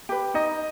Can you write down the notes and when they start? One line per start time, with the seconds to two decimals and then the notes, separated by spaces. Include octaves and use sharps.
0.09 G4 B4
0.34 D#4 D#5